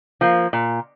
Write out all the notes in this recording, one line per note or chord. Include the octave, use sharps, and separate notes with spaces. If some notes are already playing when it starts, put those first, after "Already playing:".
F3 A#3
A#2